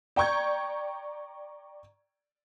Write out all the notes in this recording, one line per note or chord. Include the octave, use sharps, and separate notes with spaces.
D5 G5 A#5 C#6 G6 G#6